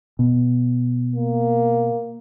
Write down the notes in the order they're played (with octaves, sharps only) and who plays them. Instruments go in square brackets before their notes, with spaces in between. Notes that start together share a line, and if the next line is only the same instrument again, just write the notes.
[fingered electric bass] B2
[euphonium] A#3